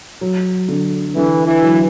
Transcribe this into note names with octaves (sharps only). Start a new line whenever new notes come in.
F#3
D3
D3 E3
E3
F#3